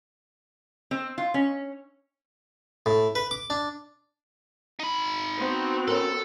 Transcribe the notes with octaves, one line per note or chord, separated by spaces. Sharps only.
C4
F4
C#4
A2
B4
D6
D4
D#4 B5
B3 C4 F#4
C#4 A4 A#4